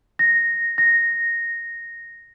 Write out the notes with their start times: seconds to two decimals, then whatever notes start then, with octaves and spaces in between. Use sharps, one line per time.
0.19 A#6
0.78 A#6